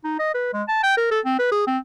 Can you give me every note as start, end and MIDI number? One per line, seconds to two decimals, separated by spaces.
0.04 0.18 63
0.19 0.34 75
0.34 0.53 71
0.53 0.62 56
0.68 0.80 81
0.83 0.95 79
0.97 1.07 70
1.11 1.20 69
1.25 1.37 60
1.39 1.48 71
1.51 1.63 68
1.67 1.78 60